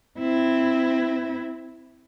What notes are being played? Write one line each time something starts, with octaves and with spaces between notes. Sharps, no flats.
C4 E4